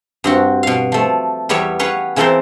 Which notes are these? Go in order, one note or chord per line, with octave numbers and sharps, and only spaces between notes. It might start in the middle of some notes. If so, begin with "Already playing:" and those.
G2 C4 F#4
B2 F5
F3 A3
E2 G3 B3 C#5 E5
C#4 B4 C#5 F5 F#5
C#3 E3 C4 A4 A#4 C5